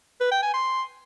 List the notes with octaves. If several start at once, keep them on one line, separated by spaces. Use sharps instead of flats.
B4
G5
G#5
C6